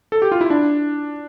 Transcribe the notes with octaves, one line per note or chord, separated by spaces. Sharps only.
A4
G4
F4
E4
D4